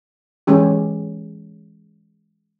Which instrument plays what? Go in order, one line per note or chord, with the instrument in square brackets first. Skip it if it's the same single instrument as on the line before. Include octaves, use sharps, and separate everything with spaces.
[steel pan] E3 G#3 C#4 G4